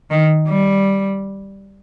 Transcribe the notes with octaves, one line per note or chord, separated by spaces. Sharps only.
D#3
G3